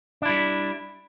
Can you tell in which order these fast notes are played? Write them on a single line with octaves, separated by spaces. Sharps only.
D4 E4 G3